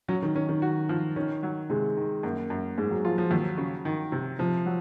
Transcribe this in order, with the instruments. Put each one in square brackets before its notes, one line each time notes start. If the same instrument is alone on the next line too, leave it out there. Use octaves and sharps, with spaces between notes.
[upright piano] F#3 [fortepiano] C#4
[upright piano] D#3
[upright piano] D#3 [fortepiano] C#4
[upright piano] D#3
[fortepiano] F#4
F3
[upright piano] D#3 [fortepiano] C#4
[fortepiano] F#3
[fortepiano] C3 [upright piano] G#3
[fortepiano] D#3
[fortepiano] F#2 [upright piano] A#3
[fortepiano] F#2
[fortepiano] G#2 [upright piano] G#3
[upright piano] F#3
[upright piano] F3 [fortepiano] F4
[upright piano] F3
[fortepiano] D#2 [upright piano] F#3
[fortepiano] C#3
D#3
C3
[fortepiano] C3 [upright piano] F3
[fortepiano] F#3